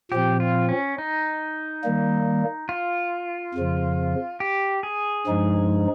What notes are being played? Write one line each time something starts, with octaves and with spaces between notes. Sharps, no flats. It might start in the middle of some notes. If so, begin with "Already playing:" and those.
A#2 F3 C4 G4
F4
C#4
D#4
D#3 G3 A#3
F4
F2 C#3 F3
G4
G#4
G2 F3 G#3 D#4